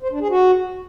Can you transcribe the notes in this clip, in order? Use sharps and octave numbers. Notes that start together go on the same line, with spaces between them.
C5
D4
G#4
F#4